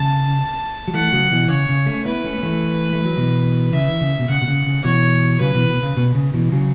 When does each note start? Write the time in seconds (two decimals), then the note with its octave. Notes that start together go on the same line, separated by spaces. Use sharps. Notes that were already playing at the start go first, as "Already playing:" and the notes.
Already playing: C#3 A5
0.88 F#3
0.94 E3 A3 F#5
1.12 C#3 F#3
1.31 B2 E3
1.49 C#3 C#5
1.69 C#3
1.86 A3 C#4
2.05 B3 E4 B4
2.24 A3 C#4
2.38 B3
2.43 E3 A3
2.93 A3
3.05 F#3
3.17 B2 E3
3.73 C#3 E5
3.87 E3
4.01 C#3
4.19 B2
4.29 C#3 F#5
4.42 B2
4.48 C#3
4.66 C#3
4.84 B2 E3 C#5
5.40 C#3 F#3 B4
5.54 B2 E3
5.69 B2
5.82 C#3
5.97 B2
6.15 C#3
6.34 B2 E3
6.52 C#3 F#3